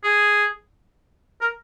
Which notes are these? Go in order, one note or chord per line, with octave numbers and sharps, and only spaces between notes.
G#4
A#4